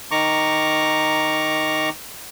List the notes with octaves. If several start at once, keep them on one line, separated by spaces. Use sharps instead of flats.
D#3 A#5 C#6 D6